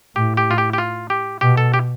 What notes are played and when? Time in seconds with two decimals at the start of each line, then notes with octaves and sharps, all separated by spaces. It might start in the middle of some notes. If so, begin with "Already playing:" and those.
0.16 A2 G4
0.37 G4
0.51 F4
0.58 G4
0.73 G4
0.78 F4
1.10 G4
1.41 B2 G4
1.57 A4
1.74 G4